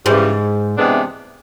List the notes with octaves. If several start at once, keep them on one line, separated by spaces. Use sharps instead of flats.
G#2 C#3 E3 G3
C3 E3 G#3 B3 D4